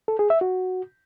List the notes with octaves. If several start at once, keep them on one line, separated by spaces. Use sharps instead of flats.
A4
G#4
E5
F#4